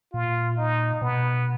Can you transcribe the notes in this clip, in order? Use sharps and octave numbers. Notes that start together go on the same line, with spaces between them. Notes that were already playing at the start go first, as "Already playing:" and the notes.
A#2 F4
D#4
B2 B3